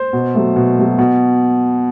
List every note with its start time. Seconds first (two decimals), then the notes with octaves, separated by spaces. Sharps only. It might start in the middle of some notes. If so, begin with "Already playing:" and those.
Already playing: C5
0.13 B2
0.34 F#3 A3
0.56 B2
0.77 F#3 A3
0.99 B2